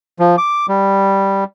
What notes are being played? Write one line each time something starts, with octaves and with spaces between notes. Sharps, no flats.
F3
D6
G3